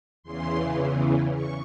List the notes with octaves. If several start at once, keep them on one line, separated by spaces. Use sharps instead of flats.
E2 C#3 E3 C6
C#6